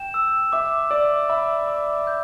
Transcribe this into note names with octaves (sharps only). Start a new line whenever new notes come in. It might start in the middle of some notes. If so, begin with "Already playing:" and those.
Already playing: G5 E7
E6
E5 D6
D5 D6
E5 B5
D6
G6